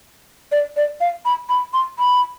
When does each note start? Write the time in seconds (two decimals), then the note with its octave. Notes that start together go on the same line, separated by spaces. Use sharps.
0.52 D5
0.77 D5
1.01 F5
1.25 B5
1.49 B5
1.73 C6
1.99 B5